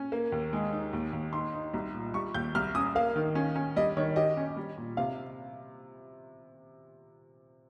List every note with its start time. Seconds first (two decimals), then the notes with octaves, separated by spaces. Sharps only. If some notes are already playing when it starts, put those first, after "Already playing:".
Already playing: C#4
0.12 A#3
0.32 D#2
0.53 G#3
0.73 D#4
0.93 D#2
1.13 D#2
1.33 D#4 C6
1.54 D#4
1.74 C2
1.94 A#2
2.14 G3 C#6
2.34 D#2 G6
2.55 C2 F6
2.75 C#4 D#6
2.95 A#3 F5
3.16 D#3
3.35 C#4
3.56 C#4
3.76 G3 D#5
3.97 D#3 C#5
4.16 G4 D#5
4.37 C#4
4.56 G3
4.77 A#2
4.97 C3 F5